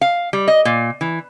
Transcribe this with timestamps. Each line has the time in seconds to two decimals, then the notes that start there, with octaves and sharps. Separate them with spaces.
0.01 F5
0.33 G3
0.48 D#5
0.65 A#2
1.01 E3